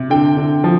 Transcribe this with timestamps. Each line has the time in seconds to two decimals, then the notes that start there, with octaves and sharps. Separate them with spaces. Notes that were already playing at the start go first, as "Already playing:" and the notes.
Already playing: C3
0.10 D3 G5
0.37 D3
0.64 F3